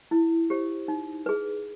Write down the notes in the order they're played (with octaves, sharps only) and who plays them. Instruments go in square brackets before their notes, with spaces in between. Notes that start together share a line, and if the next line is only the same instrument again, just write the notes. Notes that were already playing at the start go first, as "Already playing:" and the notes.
[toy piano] E4
G4 C5
D#4
G#4 B4